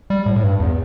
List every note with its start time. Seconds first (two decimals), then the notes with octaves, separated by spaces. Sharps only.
0.10 G3
0.26 A2
0.36 A2
0.43 G2
0.60 E2